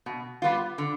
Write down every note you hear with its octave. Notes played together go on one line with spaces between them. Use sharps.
B2
G3 B3 F4
D3